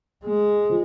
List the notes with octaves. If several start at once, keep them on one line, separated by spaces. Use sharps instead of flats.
G#3
F3